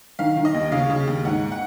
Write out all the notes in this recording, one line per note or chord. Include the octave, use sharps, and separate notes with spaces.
D#3 F5
D#3
D#5
D#2
C#3 F5
C#3
D#2
G#2 F#5
F#5